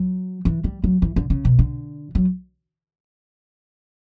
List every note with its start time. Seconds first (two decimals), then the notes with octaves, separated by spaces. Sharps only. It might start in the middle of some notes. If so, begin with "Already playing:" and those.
Already playing: F#3
0.45 E3
0.64 G3
0.84 F#3
1.02 E3
1.16 D3
1.30 C#3
1.45 B2
1.59 D3
2.15 F#3